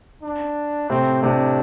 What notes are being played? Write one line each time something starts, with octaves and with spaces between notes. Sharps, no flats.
D4
A2 C3 C4
A2 C3 D4